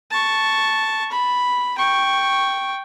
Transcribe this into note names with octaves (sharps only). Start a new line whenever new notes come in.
A5 C#6
B5
G5 C#6